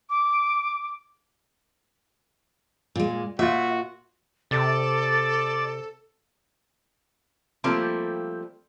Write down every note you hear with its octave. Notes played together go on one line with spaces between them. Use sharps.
D6
A#2 G#3
A#2 F4 F#4 E5
C3 A4 D5 A6
F3 G3 A3 A#3 C4